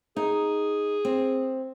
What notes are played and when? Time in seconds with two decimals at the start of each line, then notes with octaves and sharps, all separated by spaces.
0.17 D#4 G#4
1.05 C4